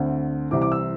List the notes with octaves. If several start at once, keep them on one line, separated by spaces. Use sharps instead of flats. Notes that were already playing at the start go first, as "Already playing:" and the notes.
Already playing: D2 D3 C4
C2 C3 E3 C4 D6
D6
E6